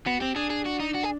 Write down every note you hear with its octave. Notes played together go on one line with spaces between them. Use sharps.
B3 F#4
C4 G4
D4 G#4
G#4
F#4
D#4
F#4
G#4